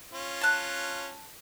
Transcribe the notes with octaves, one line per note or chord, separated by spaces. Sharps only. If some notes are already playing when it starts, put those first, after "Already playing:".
C#4 F4
A5 F#6